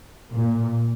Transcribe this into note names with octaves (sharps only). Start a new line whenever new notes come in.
A#2